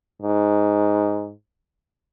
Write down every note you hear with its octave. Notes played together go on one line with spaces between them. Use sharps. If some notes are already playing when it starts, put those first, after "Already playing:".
G#2